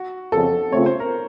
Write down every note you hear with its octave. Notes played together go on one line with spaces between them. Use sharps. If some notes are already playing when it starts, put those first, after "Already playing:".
Already playing: F#4
F2 C#3 F3 C4 A4
C#3 A3 C4 F4 C#5
C5
A#4